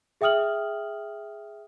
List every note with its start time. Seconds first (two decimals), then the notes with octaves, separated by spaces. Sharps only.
0.21 G#4 E5 G5 D#6 F6 F#7